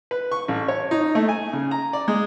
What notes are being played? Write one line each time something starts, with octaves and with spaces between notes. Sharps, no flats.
B4
C#6
A1
C#5
D#4
A3
G#5
C#3
A#5
D5
G#3